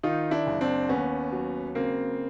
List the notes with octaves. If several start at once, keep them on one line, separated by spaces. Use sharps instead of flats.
D#3 D#4 F4
D4 E4
F#1
C4 D4
D#2 B3 C#4
F#3
C#3 A#3 C4